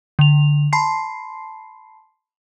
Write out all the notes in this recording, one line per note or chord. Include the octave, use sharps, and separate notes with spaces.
D3 F7
A5 B5 C6 C7